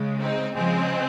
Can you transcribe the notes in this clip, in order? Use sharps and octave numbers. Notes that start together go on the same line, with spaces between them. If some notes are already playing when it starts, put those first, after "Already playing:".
Already playing: C#3 G#3
C4 D#4
C#3 F3 G#3 C4